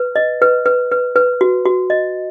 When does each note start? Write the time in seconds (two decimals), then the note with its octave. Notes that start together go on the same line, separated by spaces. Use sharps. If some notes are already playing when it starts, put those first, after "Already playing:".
Already playing: B4
0.16 D#5
0.42 B4
0.66 B4
0.91 B4
1.16 B4
1.41 F#4
1.65 F#4
1.90 D#5